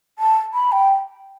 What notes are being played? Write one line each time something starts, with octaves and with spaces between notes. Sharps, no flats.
A5
B5
G5